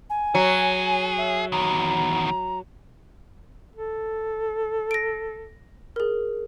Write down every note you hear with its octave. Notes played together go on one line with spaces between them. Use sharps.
G#5
F#3 G#4
E5
E2 D#3 A#5
A4
A#6 D7
G#4 A#4